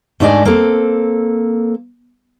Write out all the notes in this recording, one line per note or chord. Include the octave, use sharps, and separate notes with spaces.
G#2 A3 D4 D5 D#5 G#5
A#3 C4 A4